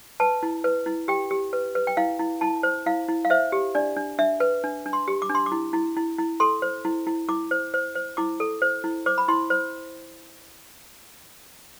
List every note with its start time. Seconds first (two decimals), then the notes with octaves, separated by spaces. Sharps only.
0.20 B4 A5
0.43 E4
0.64 B4
0.86 E4
1.08 G4 G5
1.31 G4
1.53 B4
1.75 B4
1.87 G5
1.97 E4 F5
2.19 E4
2.41 E4 A5
2.63 C5
2.86 E4 F5
3.08 E4
3.25 F5
3.30 C5 E5
3.52 G4
3.75 D4 D5
3.96 D4
4.19 D4 E5
4.40 B4
4.64 D4
4.86 D4
4.93 C6
5.08 G4
5.22 D6
5.29 D4
5.35 C6
5.46 D6
5.52 E4
5.73 E4
5.97 E4
6.18 E4
6.40 A4 C6
6.62 C5
6.85 E4
7.07 E4
7.29 E4 D6
7.51 C5
7.74 C5
7.95 C5
8.17 E4 D6
8.40 A4
8.62 C5
8.84 E4
9.06 C5 D6
9.18 B5
9.28 E4 C6
9.50 C5